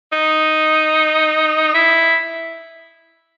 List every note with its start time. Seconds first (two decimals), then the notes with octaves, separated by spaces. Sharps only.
0.12 D#4
1.74 E4